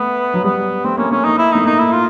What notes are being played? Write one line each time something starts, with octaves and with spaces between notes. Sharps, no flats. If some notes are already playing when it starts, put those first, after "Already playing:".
Already playing: A3 B3
F#3
G3 B3
A3 C4
A#3 C#4
A3 C#4
A#3 D#4
E4
A3 D#4
A#3 D#4
E4
F4